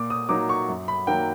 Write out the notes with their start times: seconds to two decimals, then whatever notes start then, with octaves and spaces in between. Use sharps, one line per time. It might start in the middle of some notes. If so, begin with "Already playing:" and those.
Already playing: A#2 D6
0.10 D#6
0.29 F#3 A#3 D#4 D6
0.49 C#6
0.68 F#2
0.88 B5
1.07 D#3 F#3 A#3 G5